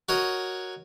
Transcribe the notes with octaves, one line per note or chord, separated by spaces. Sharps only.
F#4 A#4 C#5 D#5